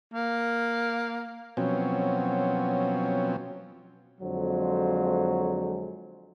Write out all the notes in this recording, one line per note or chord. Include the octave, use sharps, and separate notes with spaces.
A#3
B2 F3 F#3 C4 C#4
F2 D3 F#3 G#3 C5